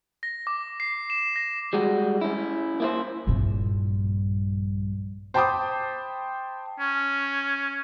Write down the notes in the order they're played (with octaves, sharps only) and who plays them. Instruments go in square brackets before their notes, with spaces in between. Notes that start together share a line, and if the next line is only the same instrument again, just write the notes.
[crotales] A#6
D6
C7
E7
A#6
[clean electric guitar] G3 G#3 F#4
C#4 E4
A#3 E4 C5
[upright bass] A#1 G2
[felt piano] C5 G5 A5 B5 D6 D#6
[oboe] C#4